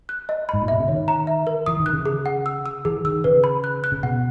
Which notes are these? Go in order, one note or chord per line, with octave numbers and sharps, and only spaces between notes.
F#6
D#5
G#2 B5
A#2
B2 E5
C#3
D#3 C#5
A#5
E5
A#4
E3 D#6
D#3
F#6
C#3
G#4
F#5
E6
E6
E3 G#4
D#3 E6
C#3 B4
B5
F#6
F#6
C#3
B2 F#5